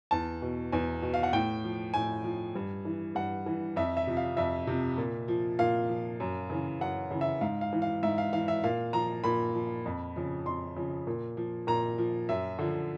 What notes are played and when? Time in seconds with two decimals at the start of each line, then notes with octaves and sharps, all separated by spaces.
0.11 E2 A5
0.42 B2
0.72 E2 G#5
1.03 B2
1.14 F5
1.23 F#5
1.33 A2 G5
1.64 F3
1.94 A2 G#5
2.24 F3
2.56 G2
2.85 E3
3.15 G2 F#5
3.46 E3
3.76 F2 E5
3.97 E5
4.07 C3 F3
4.17 F5
4.37 F2 E5
4.67 C3 F3
4.98 A#2
5.28 F3
5.59 A#2 F5
5.89 F3
6.20 F#2
6.50 C#3 E3
6.81 F#2 F#5
7.11 C#3 E3
7.21 E5
7.41 G#2 F5
7.61 F5
7.73 E3
7.82 F5
8.03 G#2 E5
8.18 F5
8.33 E3 F5
8.48 E5
8.64 A#2 F5
8.93 F3 A#5
9.24 A#2 B5
9.54 F3
9.86 F2
10.16 C#3 F3
10.45 F2 C6
10.76 C#3 F3
11.07 A#2
11.37 F3
11.67 A#2 A#5
11.98 F3
12.29 F#2 E5
12.59 D3 F3